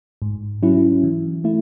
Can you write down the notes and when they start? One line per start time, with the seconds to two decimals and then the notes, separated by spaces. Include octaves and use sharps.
0.22 G#2
0.63 F#3 C#4 E4
1.04 E3
1.44 A3 E4